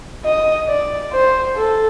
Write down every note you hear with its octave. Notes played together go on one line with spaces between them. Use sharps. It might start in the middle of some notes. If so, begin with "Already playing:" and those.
D#5
D5
C5
A4